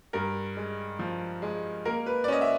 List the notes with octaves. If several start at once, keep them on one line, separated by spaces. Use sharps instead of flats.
G2 A#4
G#3
F3
G#3
A#3 A#4
B4
D5
C#4 D#5
E5